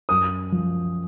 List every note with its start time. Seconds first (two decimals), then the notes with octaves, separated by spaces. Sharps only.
0.09 F#2 D#6
0.52 F3